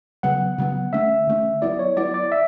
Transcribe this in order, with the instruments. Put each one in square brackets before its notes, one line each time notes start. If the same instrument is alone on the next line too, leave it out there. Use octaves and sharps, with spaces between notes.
[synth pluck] C#3 F#3 B3 [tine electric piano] F#5
[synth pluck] C#3 F#3 B3
[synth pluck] D3 A3 C#4 [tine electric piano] E5
[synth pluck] D3 A3 C#4
[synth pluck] F#3 B3 E4 [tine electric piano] D5
[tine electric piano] C#5
[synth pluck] F#3 B3 E4 [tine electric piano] D5
[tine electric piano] D5
E5